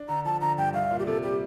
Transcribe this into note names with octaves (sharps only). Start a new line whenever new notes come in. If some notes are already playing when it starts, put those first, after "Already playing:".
Already playing: D4
D3 A#5
F3 A5
D3 A#5
G2 G5
C2 F5
A#2
G4
C3 A4
G3 G4